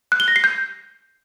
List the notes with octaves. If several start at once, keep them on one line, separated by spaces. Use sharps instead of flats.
F#6
G7
A#6
C7
G6